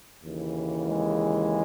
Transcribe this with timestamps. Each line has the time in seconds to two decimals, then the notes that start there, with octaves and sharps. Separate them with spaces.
0.23 D#2 C#3 E3
0.89 G#3